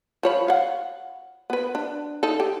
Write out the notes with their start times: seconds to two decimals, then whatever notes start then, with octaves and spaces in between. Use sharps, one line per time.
0.23 F3 C#5 B5
0.48 F5 F#5
1.50 B3 B4
1.75 D4
2.23 D#4 A4
2.40 G4